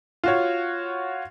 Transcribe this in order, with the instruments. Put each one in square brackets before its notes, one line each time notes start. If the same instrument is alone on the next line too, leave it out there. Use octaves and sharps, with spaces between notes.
[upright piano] F4 F#4 C#5